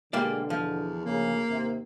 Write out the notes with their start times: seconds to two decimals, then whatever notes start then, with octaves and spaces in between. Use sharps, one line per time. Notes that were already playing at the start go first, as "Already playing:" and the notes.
0.13 B2 D3 G3 G#3 A#3 D5
0.50 E2 F3
1.05 D2 C#3 A#3
1.49 D#2 C3